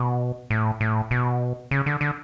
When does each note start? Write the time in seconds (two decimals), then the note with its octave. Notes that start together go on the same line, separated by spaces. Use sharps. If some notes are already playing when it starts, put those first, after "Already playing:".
Already playing: B2
0.50 A2
0.81 A2
1.11 B2
1.71 C#3
1.86 D3
2.01 D3